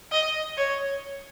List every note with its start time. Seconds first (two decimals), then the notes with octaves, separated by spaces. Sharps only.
0.12 D#5
0.57 C#5